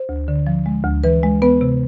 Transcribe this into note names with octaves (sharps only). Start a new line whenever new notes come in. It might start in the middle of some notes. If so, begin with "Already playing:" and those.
Already playing: C5
D2
D3
F3
G#3
D2
E3 B4
G#3
B3 B4
C3